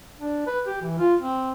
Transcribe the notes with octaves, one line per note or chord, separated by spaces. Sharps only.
D4
B4
G4
E3
F4
C4